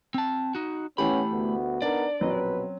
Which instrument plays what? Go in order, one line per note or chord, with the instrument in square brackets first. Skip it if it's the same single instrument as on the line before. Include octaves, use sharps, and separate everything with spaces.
[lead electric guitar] C4 A5
D#4 F#4
[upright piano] E3 G4 [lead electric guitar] A3 B5 [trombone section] B3 C#4
[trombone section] D2 B3 F#4
[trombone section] B3 D#4 A#4 [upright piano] D4 [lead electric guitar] D5
[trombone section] A#1 B2 B4 [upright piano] F#3 C4 C#4